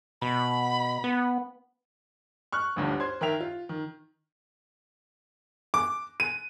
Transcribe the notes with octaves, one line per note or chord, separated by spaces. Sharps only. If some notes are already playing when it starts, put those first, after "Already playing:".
B2 B5
B3
C#6 F6 F#6
G1 D2 G2
C5 C6 G#6
D#3 A#4 E5 G5 F7
F4
D#3
D6
D#7